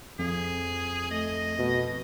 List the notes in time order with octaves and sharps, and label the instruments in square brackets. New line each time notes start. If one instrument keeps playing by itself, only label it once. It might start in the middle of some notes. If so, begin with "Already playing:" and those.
[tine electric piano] F2 [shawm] G#4
[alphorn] A3 [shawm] D#5
[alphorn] B2